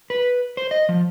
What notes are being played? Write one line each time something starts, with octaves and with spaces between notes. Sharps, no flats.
B4
C5
D#5
F3